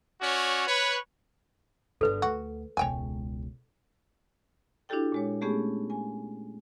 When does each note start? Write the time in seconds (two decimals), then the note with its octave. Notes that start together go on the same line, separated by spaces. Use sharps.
0.21 C#4 F#4 C#5 D5
0.67 B4 C#5
2.01 G1 D3 A4 B4
2.22 D2 F#4
2.77 E1 C#2 C#5 G5 G#5
4.89 D4 E4 F#4 G4 A4 G5
5.12 A#2 G#3 C#5
5.41 G#3 A3 B3 C#4 G4 G#4
5.90 G#5